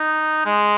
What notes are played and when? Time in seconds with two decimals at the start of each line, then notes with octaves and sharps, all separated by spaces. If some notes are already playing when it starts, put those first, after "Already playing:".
Already playing: D#4
0.46 G#3